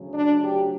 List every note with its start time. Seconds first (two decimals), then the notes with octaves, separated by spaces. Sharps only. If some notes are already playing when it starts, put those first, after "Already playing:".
Already playing: D2 C#3 F#3
0.12 D4
0.42 G4